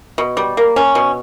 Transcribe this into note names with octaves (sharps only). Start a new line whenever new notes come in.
B2
G3
A#3
C#4
B2